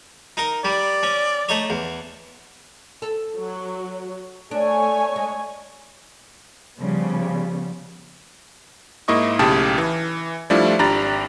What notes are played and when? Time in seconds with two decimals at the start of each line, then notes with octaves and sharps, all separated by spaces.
0.37 D#4 A#4
0.65 G3 D5
1.03 C#4
1.49 A3 D#4 C#5
1.70 E2
3.02 A4
3.38 F#3
4.51 A3 D4 C#5 G#5
5.16 G#3
6.79 C#3 F3 G3 B3
9.08 G#2 A#3 E4 D#5 C#6 D#6
9.39 B1 A2 C#3 G4 A5 D#6
9.78 E3
10.50 F3 G3 A3 D4 E4 F4
10.79 G#1 D4 G4 A#5 B5 A6